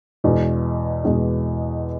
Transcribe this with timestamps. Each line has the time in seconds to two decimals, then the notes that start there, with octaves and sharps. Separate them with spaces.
0.24 E2 B2 G#3
1.05 E2 B2 G#3